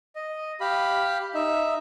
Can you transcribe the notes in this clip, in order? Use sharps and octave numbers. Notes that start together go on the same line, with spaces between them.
D#5
G4 F5 B5
D#4 E5